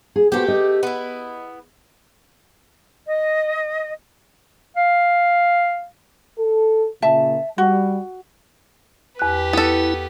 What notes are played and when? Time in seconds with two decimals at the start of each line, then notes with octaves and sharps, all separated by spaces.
0.16 G#4
0.32 A3 B3 F#4 G4 C5
0.48 D#5
0.83 B3 E4
3.08 D#5
4.76 F5
6.38 A4
7.02 A#2 C#3 E5 A5
7.58 G3 F#4
9.19 E2 G4 B4 F#6
9.53 B3 E4 A4